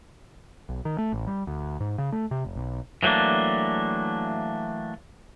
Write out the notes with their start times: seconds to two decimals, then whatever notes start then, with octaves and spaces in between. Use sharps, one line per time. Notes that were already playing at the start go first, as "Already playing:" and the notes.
0.69 B1
0.85 D#3
0.98 A3
1.13 A1
1.27 G3
1.47 D2
1.80 G#2
1.98 C#3
2.12 A3
2.31 C3
2.45 F1
2.56 B1
3.03 E3 F#3 A3 A#3 D4